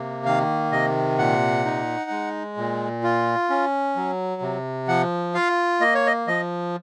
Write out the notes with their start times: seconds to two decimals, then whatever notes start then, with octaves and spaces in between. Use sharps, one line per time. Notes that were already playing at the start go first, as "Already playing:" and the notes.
Already playing: C3 A#3
0.25 D#3 F5
0.72 C3 D#5
1.18 A#2 F#5
1.65 D#4
2.11 G#3
2.57 A#2
3.04 F4
3.50 C#4
3.96 F#3
4.42 C3
4.88 F3 F#5
5.34 F4 F5
5.80 A#3 D#5
5.95 C#5
6.07 D#5
6.27 F3 D#5